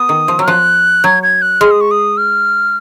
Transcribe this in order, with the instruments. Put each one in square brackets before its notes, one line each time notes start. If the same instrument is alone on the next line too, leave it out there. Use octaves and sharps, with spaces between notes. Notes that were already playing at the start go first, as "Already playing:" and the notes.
Already playing: [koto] B3 [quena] D#6
[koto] D#3
F3
F#3
[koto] F3 [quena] F#6
[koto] F#3 [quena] G#6
[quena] G#6
F#6
[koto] G#3 [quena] F6
[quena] D#6
C#6
D#6
F6